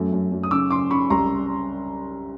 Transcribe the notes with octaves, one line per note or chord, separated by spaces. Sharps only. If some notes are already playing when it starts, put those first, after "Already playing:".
Already playing: F#2 A3
F#2
F#2
D#6
C#3 D6 E6
C#3 C6 D6
C#3 B5 C#6
C2 A#5 C6